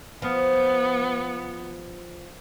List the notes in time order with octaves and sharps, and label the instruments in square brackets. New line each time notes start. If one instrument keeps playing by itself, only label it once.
[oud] F3 [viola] B3